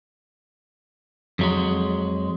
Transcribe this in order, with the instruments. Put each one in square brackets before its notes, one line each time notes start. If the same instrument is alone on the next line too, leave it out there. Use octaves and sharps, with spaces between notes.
[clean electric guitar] F2 F#3 G#3